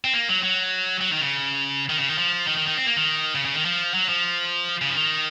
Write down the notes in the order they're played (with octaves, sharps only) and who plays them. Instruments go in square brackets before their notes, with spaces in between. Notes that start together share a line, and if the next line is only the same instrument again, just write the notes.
[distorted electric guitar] C4
A#3
F#3
F#3
F#3
D#3
C#3
D#3
C#3
D#3
F3
D#3
D#3
D#3
C4
A#3
D#3
C#3
C#3
D#3
F3
F#3
F3
C#3
F3
D#3